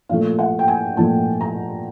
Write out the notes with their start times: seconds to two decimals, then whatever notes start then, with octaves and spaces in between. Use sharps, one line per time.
0.09 A#2 F3 A3 F5
0.39 F#5
0.59 G5
0.68 G#5
0.97 A#2 F3 A3 A5
1.41 A#5